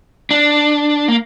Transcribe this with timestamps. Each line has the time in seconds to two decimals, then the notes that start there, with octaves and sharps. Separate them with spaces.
0.31 D4
1.08 A#3